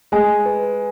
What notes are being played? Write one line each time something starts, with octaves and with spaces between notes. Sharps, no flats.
G#3 G#5
B4